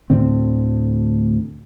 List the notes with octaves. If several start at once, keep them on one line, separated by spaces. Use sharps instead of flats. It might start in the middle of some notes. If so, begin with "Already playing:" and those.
D2 A2 D3 C4